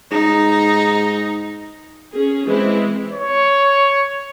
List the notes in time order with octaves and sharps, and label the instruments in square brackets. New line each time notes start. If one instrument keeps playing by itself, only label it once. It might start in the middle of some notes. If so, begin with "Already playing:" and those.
[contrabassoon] G#2 [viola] D#4
[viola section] C#4 G#4
E3 G#3 C4 E4
[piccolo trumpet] C#5